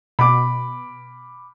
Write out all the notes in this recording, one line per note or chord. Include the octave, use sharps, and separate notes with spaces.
B2 B5 D6